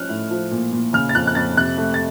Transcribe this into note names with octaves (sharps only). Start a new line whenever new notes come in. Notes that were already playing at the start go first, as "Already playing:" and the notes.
Already playing: F3 C#4 F6 F#6
A2
F3
A#2
A#2
C#3 F6
A6
F2 F#6
F#6
F2 A6
C3 F#6
A3
A6